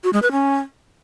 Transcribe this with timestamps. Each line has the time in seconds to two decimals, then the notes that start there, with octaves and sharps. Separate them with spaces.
0.04 F#4
0.13 G#3
0.22 B4
0.32 C#4